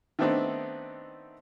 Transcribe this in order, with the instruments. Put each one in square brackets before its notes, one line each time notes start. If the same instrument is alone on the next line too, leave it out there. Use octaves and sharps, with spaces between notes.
[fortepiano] D#3 A3 B3 C4 D4 D#4